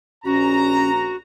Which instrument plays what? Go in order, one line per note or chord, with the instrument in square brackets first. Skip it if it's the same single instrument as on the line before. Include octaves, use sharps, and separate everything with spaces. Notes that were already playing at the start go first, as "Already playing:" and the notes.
[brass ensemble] A#1 A#5 [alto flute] C#4 [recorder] F#4